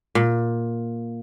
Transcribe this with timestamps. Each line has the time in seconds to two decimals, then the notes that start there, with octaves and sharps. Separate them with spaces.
0.15 A#2